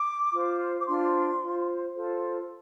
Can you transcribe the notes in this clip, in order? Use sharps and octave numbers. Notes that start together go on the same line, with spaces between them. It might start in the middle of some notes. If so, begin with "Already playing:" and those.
Already playing: D6
F4 C5
D6
D4 F4 C5 C6
F4 C5
F4 A4 C5